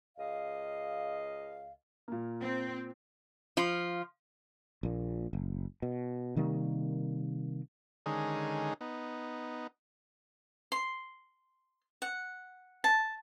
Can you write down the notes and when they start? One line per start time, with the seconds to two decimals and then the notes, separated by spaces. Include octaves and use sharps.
0.17 C#2 D#5 F5
2.08 A#2 A#3
2.41 C4
3.57 F3 F4
4.83 A#1 A#2
5.33 F#1
5.82 B2
6.36 C3 D#3 G3 A#3
8.06 D3 D#3 G#3 C#4 D#4 G#4
8.81 B3 D#4
10.72 C6
12.02 F#5
12.84 A5